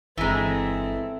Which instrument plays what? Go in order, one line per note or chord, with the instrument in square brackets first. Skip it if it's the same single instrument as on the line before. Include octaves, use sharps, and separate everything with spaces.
[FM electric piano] G1 [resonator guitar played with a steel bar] E3 G#3 [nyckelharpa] C4 A4 [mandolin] E5 G#5 A#5